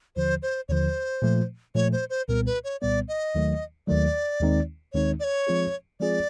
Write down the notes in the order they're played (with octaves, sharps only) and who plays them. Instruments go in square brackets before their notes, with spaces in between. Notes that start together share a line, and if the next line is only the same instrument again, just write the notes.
[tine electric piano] D#2 D3 F3 [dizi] C5
[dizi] C5
[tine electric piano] D#2 D3 F3 [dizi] C5 C#5
[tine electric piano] A#2 F3 A3
[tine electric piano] A#2 F3 A3 [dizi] C#5
[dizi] C5
C5
[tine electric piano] C2 A#2 G3 B3 [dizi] A#4
[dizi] B4
C#5
[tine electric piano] C2 A#2 G3 B3 [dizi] D5
[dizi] D#5
[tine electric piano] D#2 D#3 F#3 A3
[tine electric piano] D#2 D#3 F#3 A3 [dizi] D5
[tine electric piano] D#2 D#3 G#3 C4 D#4
[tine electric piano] D#2 D#3 G#3 C4 D#4 [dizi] C#5
[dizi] D5
C#5
[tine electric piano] F3 G#3 C4 F4 G#4
[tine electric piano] F3 G#3 C4 F4 G#4 [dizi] D5